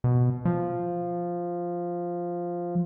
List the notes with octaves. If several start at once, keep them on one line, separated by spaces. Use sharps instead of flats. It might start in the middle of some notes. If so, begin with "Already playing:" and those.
B2
F3